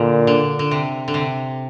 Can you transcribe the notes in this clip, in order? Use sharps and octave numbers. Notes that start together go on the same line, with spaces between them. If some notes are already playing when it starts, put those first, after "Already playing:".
Already playing: A#2 D3
D3
D3
C3
D3
C3